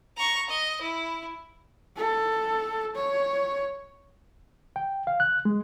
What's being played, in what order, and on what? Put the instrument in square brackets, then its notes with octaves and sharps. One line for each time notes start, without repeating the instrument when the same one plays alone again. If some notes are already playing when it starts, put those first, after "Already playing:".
[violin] A#5 C#6
D#5
E4
[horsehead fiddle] A4
C#5
[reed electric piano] G5
F5
F#6
G#3